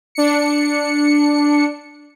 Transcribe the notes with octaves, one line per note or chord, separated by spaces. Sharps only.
D4 C#7